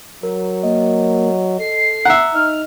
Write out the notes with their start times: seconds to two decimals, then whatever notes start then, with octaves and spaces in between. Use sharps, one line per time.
0.23 F#3 A#4
0.63 A#3 D#5
1.59 A4 C7
2.05 E5 F#5 A#5
2.34 D#4 D#5 F6